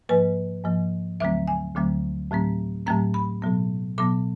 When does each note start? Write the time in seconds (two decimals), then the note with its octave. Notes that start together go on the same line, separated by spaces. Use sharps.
0.09 G#2 F3 A#3 B4
0.64 G#2 F3 A#3
1.20 D2 D3 F#3 A3 C4 E5
1.48 G#5
1.75 D2 D3 F#3 A3 C4
2.31 A2 F#3 A3 C4
2.87 A2 F#3 A3 C4 A#5
3.14 B5
3.42 B2 F#3 B3
3.98 B2 F#3 B3 D6